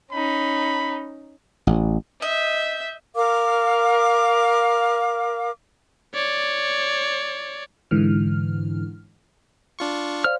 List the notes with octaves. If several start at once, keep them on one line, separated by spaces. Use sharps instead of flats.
C#4 D#4 B5
A1
D#5 E5 G6
A#4 F5 D6
C#5 D5
G#2 D3 E3 F6
D4 F4 C#6
C5 D5 F5 F6